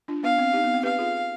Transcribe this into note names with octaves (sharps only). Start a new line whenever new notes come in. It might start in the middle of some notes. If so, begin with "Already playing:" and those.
D4 F4
B3 D4 F5
C4
D#4 G4
B3
C4
G4 B4 F5
F4 G#4